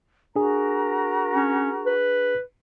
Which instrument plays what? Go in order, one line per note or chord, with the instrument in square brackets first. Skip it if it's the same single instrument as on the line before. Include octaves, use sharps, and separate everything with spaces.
[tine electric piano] D4 G#4 [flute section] F#4 A#4 A#5
[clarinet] C#4
B4